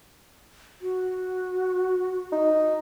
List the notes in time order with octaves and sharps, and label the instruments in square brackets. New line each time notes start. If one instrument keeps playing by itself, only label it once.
[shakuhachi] F#4
[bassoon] D#4